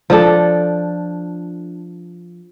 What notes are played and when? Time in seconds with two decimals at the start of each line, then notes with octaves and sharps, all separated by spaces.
0.10 F3 D4 A4